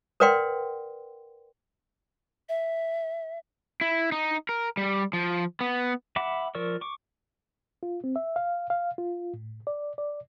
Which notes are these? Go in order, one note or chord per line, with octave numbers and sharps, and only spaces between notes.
A#4 B4 D5 F#5 G5 C6
E5
E4
D#4
A#4
G3
F3
B3
E5 F#5 B5 D6
F3 A#4 D5 C#6 E6
C#6 D6
F4
C4
E5
F5
F5
F4
A2
D5
D5